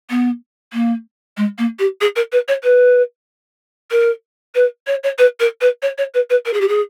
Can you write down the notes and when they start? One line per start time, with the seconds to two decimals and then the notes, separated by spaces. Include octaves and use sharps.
0.10 B3
0.73 A#3
1.37 G#3
1.58 A#3
1.79 G4
2.01 G#4
2.16 A#4
2.32 B4
2.48 C#5
2.64 B4
3.91 A#4
4.55 B4
4.87 C#5
5.03 C#5
5.18 B4
5.40 A#4
5.61 B4
5.82 C#5
5.98 C#5
6.14 B4
6.30 B4
6.46 A#4
6.53 G#4
6.61 G4
6.68 G#4